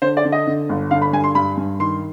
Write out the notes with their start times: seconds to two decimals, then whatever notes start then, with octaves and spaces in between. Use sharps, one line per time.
0.02 D3 C5
0.17 D5
0.25 D3
0.32 D#5
0.47 D3
0.69 G1
0.91 D3 F5
1.02 B5
1.13 G2 G#5
1.24 C6
1.35 G2 B5
1.57 G2
1.79 D#3 C6